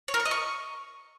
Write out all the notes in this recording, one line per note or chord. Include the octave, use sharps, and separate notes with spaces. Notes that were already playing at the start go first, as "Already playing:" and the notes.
C#5
A#4
C#6
D#5
C#6